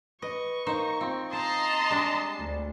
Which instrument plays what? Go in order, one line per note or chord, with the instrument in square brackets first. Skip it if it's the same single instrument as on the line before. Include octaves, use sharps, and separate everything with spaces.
[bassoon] B4 [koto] D#5 [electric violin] C#6
[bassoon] A#3 [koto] D#4 C5
[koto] C4 [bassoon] F4
[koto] C5 [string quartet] D#5 A#5 C6 [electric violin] A5 C7
[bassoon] G3 [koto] G#3 D4
[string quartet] D2